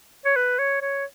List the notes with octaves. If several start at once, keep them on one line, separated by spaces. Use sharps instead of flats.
C#5
B4
C#5
C#5